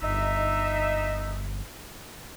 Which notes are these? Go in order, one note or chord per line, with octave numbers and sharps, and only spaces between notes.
G1 D#4 E5